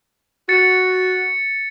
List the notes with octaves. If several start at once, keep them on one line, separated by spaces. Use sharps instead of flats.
F#4 A6 C#7